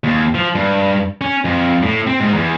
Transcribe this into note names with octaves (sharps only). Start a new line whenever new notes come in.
D#2
F3
G2
C#4
F2
A2
C4
G#2
E2